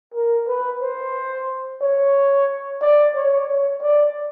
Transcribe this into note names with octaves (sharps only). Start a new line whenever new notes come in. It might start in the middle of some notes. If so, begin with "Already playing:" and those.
A#4
B4
C5
C#5
D5
C#5
C#5
D5